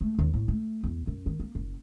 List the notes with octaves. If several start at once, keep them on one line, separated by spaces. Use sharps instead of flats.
A3
D#2
A2
A3
E2
F#2
D#3
A#3
F#1